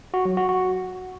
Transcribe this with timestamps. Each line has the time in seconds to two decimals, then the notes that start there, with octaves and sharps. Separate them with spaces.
0.14 F#4
0.25 F#3
0.37 F#4
0.49 F#4